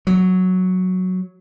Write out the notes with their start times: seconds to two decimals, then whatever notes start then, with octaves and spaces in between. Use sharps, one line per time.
0.07 F#3